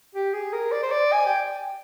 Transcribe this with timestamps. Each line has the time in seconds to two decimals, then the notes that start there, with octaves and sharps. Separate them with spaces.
0.15 G4
0.33 G#4
0.53 A#4
0.72 D5
0.83 C5
0.91 D5
1.12 G#5
1.26 G5